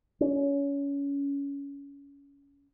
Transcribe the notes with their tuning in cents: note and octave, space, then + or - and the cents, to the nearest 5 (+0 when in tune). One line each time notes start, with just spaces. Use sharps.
C#4 +25